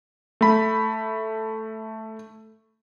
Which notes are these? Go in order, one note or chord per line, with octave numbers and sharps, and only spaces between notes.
A3 B5